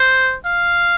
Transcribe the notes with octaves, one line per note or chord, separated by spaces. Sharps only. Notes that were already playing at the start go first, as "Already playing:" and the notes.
Already playing: C5
F5